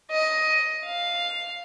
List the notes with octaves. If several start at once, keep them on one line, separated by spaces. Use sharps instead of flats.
D#5
F5